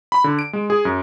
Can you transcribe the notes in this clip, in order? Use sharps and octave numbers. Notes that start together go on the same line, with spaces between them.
B5
D3
D7
G#3
G#4
F#2